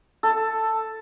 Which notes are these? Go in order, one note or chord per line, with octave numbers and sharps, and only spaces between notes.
A4